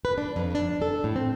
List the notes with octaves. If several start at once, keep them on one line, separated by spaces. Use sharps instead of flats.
B4
D4
F2
D4
A4
A2
C4